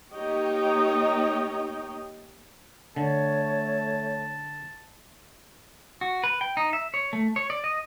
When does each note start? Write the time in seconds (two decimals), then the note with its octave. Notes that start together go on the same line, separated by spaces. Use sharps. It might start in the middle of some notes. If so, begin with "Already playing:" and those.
0.14 A#3 D#4 G4 C#5 D#5 G5
2.96 D3 A3 C#5 A5
6.01 F#4
6.24 B4
6.41 G5
6.57 D#4
6.73 E5
6.94 C#5
7.13 A3
7.36 C#5
7.50 D5
7.64 D#5